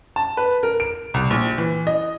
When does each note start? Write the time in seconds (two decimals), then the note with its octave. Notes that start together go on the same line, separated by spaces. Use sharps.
0.16 A5
0.37 B4
0.63 A#4
0.80 D7
1.14 C2
1.30 A#1
1.58 E3
1.87 D#5